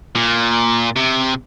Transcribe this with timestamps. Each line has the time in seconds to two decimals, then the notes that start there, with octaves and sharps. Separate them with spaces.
0.15 A#2
0.96 C3